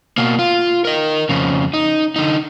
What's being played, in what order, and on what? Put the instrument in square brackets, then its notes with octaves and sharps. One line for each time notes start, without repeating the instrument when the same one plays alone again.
[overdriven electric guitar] B2 A#3
F4
A#4 D#5
F2 C#3
D#4
D3 D#4